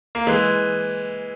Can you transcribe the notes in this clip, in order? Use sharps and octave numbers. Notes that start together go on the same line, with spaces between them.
A#3
E3 G#3